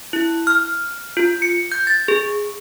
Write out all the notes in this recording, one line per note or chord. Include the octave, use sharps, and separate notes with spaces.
E4
F6
F4
C#7
G6
A6
G#4